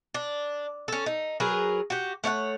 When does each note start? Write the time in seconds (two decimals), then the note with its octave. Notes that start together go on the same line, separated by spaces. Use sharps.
0.14 D4
0.88 C#4 A4
1.06 D#4
1.40 F#3 G#4 A#4 B4
1.90 F#4 G4
2.24 A3 C#5 E5 F#5